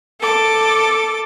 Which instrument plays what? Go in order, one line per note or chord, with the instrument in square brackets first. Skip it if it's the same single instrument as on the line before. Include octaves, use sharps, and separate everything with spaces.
[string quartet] A4 D6